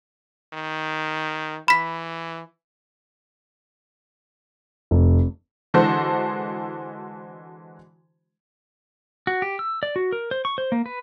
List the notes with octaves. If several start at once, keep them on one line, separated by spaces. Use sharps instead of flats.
D#3
E3 B5 B6
F1
D3 E3 G#3 F#4 A4 C5
F#4
G4
E6
D5
F#4
A#4
C5
C#6
C5
A#3
B4